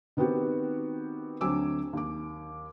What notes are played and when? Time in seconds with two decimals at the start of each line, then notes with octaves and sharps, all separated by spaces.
0.17 D#3 B3 C4 F#4 G4
1.41 D2 F#3 C4 G#5 D6 E6
1.93 D#2 D6